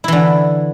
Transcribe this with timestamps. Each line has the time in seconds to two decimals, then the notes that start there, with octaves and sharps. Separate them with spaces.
0.04 E4
0.08 E3
0.12 D3